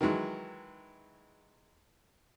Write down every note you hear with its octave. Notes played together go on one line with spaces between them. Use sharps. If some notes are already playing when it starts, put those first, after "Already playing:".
D#3 E3 F#3 G#3